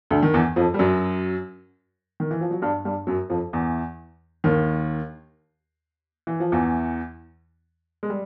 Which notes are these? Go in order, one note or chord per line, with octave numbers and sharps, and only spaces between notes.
D2 D3
D#3
E2 E3
F2 F3
G3
F#2 F#3
D#3
E3
F3
F#3
G2 G3
G2 G3
F#2 F#3
F2 F3
E2 E3
D#2 D#3
E3
F3
E2 E3
G#3
G3